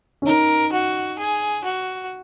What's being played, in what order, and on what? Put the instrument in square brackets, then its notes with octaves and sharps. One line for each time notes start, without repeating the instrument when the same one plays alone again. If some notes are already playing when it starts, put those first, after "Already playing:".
[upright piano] C#4
[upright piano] D#4 [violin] A#4
[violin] F#4
G#4
F#4